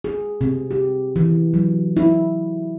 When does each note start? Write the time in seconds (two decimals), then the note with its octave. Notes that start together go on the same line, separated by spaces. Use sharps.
0.04 G#4
0.41 C3
0.71 G4
1.16 E3
1.54 F#3
1.97 E4